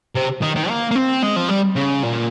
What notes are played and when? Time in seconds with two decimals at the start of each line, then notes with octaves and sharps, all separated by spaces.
0.15 C3
0.42 D#3
0.56 D#3
0.69 A#3
0.91 A#3
0.95 C4
1.23 G#3
1.36 F3
1.48 G3
1.76 C#3
2.03 A#2